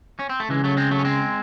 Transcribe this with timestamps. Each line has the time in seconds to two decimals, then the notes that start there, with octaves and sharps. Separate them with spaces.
0.19 C#4
0.29 C4
0.40 A3
0.49 C#3 E3 G#3
0.64 F#3 A3
0.77 G#3 C4
0.91 F#3 A3
0.99 C#4
1.05 G#3 C4